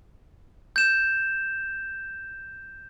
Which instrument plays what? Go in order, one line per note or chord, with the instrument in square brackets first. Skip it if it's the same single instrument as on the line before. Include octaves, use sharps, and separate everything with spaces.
[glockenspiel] G6 E7